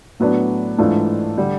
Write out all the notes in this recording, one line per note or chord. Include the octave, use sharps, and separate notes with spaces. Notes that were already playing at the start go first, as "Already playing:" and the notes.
A2 F#3 B3 D4
G#2 E3 A3 D4 F4
D3 G3